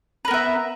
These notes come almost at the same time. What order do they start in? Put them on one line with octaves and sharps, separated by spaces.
B4 A#4 B3 E5